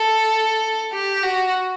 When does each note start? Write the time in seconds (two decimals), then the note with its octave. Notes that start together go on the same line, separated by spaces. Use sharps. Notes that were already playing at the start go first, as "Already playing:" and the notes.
Already playing: A4
0.93 G4
1.23 F#4